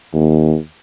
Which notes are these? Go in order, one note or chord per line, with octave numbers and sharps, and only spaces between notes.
D#2